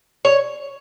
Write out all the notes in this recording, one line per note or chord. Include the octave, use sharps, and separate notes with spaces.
C#5